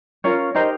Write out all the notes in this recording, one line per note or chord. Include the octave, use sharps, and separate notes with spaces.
C#4 F4 A#4 C#5
D#4 G4 A#4 C5 D#5